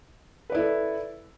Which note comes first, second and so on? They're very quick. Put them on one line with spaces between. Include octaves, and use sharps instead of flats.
B4 D5 E4 A4